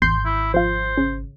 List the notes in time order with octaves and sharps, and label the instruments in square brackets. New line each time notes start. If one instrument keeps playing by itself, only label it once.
[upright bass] G#1 [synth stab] E2 C6 G6
[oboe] E4
[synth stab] F3 F4 [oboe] C5
[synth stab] C#3